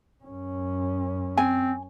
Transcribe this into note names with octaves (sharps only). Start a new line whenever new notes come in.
F#2 C#4
C4 G#5